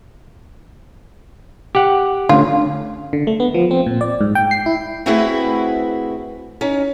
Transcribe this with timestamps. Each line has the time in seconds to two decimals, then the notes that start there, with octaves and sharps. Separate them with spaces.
1.75 G4 F#5
2.29 D3 A3 C#4 F4
3.13 D3
3.27 A3
3.40 B3
3.54 F3
3.71 C4
3.86 A#2
4.01 D5
4.21 G#2
4.35 G5
4.51 C7
4.66 E4
5.06 A3 C4 E4 F#4 G#4 B4
6.61 C#4 D#4